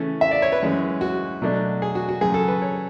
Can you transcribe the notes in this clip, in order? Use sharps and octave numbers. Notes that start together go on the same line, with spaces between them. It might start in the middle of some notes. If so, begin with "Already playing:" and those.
Already playing: C#3 E3 A3 C#4
E5
D5
C#5
B4
F#2 E3 G#3 C#4
F#4
B2 F#3 A3 D4
G#4
F#4
F#4
F#2 C#3 F#3 C#4 G#4
A4
B4
C#5